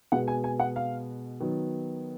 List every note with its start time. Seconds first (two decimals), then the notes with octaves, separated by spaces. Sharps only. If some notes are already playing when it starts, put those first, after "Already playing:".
0.12 B2 G#3 B3 F#5
0.28 G#5
0.44 G#5
0.60 F#5
0.76 F5
1.40 D#3 F#3 B3